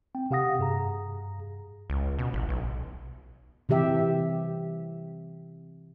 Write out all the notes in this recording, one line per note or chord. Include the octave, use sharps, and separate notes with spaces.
C4 G5
C3 G4 F5 F#5 D#6 A#6
G2 G#4 A#5
C#2
B2
A1
B1
C3 E3 G4 E5